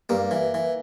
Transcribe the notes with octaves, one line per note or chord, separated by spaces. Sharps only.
G2 A#3
E3
E3